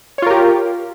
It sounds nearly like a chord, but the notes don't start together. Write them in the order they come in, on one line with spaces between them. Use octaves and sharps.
C#5 F4 A#4 G4